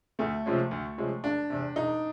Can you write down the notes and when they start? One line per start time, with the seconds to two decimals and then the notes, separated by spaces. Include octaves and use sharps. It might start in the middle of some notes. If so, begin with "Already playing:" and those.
0.19 D2 A3
0.46 C3 F3 G#3 C#4
0.71 D2
0.98 C3 F3 G#3 C#4
1.24 E1 D4
1.50 E2 C3
1.76 E1 D#4